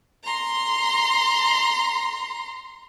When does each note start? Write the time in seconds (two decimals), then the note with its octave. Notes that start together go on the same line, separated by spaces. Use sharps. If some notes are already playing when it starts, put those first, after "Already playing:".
0.24 A#5 C6